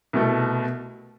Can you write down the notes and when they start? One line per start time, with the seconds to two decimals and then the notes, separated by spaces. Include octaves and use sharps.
0.13 C2 B2 A3